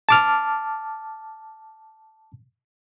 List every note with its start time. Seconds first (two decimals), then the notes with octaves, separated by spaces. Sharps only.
0.09 A5 D6 F6